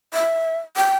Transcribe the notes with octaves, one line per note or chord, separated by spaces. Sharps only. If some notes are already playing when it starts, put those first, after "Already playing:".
E5
G5